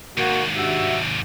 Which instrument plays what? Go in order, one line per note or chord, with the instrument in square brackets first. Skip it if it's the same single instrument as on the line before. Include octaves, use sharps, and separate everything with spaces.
[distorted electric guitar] D#2 G#2 [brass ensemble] A#3 F#4
[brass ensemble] G2 F#4 E5